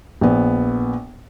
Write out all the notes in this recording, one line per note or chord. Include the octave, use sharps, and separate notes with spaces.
A#1 B3